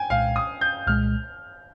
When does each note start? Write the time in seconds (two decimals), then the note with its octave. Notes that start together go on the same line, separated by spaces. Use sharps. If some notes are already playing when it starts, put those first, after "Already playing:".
Already playing: G5 G#5
0.10 C2 A#2 G#3 F5
0.36 D#6
0.61 G6
0.87 C2 A#2 G#3 F6